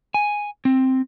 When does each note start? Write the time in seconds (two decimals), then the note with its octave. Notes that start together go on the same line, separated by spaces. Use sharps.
0.14 G#5
0.65 C4